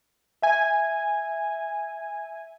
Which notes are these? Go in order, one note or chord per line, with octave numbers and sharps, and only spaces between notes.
E5 G#5